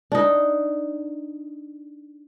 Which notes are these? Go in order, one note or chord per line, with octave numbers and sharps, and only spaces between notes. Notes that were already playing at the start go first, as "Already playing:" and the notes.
D4 D#4